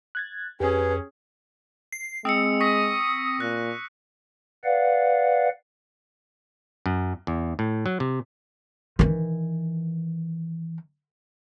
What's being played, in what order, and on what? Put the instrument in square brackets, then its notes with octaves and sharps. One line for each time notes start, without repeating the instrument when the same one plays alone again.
[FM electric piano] F#6 G#6 A6
[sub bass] F2 [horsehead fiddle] C#4 G#4 [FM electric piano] G4 [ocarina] B4
[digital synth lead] C7
[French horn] G#3 [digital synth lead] C4 [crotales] D#6 E6 C#7
[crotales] C#6 A#6 B6 [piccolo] D#6
[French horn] A#2 [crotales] F#6 A#6
[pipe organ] B4 D5 F5 F#5
[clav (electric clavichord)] F#2
E2
A2
F#3
C3
[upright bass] D#3 E3